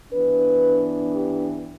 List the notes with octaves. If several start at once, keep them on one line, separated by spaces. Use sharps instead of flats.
G2 E3 B3 D4 B4
G4